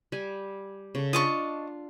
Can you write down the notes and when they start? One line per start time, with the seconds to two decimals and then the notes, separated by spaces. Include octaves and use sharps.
0.12 G3 G#5
0.95 C#3 A4
1.13 D4 F4 D#5 A5 C#6